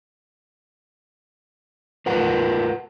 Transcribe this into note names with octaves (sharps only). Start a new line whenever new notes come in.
F4 A#4 B4 F#5